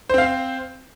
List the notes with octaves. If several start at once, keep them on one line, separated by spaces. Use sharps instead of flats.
C4 C5 F5